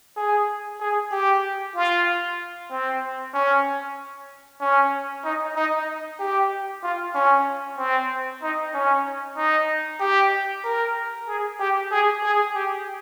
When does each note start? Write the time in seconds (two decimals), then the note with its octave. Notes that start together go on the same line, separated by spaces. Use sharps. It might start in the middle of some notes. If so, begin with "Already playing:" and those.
0.17 G#4
0.80 G#4
1.12 G4
1.75 F4
2.71 C4
3.34 C#4
4.61 C#4
5.24 D#4
5.56 D#4
6.20 G4
6.83 F4
7.15 C#4
7.78 C4
8.42 D#4
8.74 C#4
9.37 D#4
10.00 G4
10.64 A#4
11.27 G#4
11.60 G4
11.91 G#4
12.23 G#4
12.55 G4